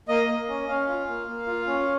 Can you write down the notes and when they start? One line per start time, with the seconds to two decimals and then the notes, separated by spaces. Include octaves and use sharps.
0.09 A#3 D#5
0.28 A#3
0.49 C#4
0.68 C#4 F5
0.88 F4
1.08 A#3
1.28 A#3
1.47 F4
1.67 C#4